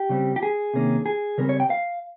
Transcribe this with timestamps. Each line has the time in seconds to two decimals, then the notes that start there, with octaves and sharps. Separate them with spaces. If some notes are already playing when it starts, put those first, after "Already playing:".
Already playing: G4
0.09 C#3 G3 C4
0.36 G4
0.43 G#4
0.74 C3 D#3 A#3 C#4
1.06 G#4
1.38 C#3 G3 C4 A#4
1.49 C#5
1.60 G5
1.70 F5